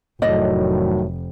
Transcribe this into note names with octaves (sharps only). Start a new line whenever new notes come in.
F1 A2 D#3 F#3 D5 D#5